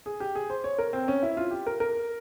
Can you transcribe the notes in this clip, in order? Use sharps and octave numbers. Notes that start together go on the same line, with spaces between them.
G#4
G4
G#4
C5
C#5
A#4
C4
C#4
E4
F4
G4
A#4
A#4